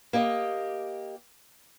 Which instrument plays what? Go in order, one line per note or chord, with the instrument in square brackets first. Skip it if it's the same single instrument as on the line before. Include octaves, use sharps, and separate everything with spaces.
[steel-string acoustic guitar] A#3 G4 D#5